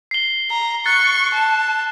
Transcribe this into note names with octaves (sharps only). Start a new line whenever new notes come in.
C7 G7
A#5
C#6 F#6 A6
A5